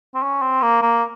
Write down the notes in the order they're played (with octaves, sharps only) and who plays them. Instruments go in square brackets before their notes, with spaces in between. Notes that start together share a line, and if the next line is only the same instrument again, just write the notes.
[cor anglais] C4
C#4
C4
A#3
A#3